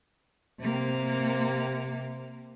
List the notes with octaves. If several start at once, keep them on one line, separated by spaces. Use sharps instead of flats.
C3 A#3